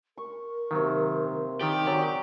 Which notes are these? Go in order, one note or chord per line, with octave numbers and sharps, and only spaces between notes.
A#4 C#6
C3 D#3 F#3 A#3
D#3 G4 D5
F#3 G#4 D5